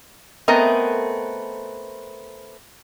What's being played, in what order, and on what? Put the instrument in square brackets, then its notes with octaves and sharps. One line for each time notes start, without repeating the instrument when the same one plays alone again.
[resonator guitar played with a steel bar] A3 B3 C4 A#4 D#5